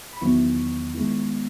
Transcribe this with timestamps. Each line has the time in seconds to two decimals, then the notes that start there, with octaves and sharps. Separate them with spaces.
0.13 B5
0.21 E2 D#3 F#3 B3 E4 C#6
0.94 D#3 G#3 B3 E4